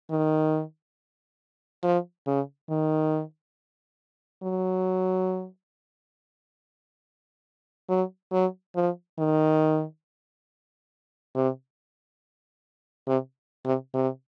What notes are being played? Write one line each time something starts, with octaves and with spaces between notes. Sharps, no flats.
D#3
F3
C#3
D#3
F#3
F#3
F#3
F3
D#3
C3
C3
C3
C3